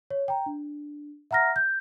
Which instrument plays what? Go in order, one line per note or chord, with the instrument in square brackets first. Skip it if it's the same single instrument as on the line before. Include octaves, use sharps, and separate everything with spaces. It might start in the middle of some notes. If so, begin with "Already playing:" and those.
[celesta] C#5
G5 A#5
D4
E5 F#5 A#5 F6 A#6
G6